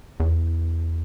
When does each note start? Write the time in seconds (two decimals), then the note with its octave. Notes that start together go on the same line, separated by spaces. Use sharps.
0.20 E2